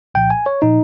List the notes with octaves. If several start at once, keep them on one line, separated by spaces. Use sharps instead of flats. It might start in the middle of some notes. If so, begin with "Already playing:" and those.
C2 A#2 F3 G5
G#5
C#5
A#2 F3 D#4